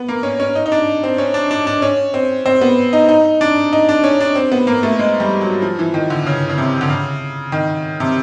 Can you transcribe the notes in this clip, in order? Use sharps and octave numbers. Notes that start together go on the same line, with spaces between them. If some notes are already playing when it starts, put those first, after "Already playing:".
Already playing: B3
A#3
C#4
C#4
D#4
D#4
D4
C4
C#4
D4
D4
D4
C#4
C4
C4
B3
D#4
D#4
D4
D#4
D4
C#4
D4
C4
B3
A#3
A3
G#3
G3
F#3
F3
E3
D#3
D3
C#3
C#3
C3
D3
C#3
D#3
C3